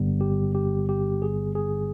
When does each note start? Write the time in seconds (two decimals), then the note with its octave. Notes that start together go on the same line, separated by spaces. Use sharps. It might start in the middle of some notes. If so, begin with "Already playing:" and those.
Already playing: G1 G2 D3 G3 B3
0.21 G4
0.55 G4
0.89 G4
1.22 G#4
1.55 G#4